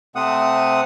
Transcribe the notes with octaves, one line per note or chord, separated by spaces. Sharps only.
C3 A3 C4 F#5 D#6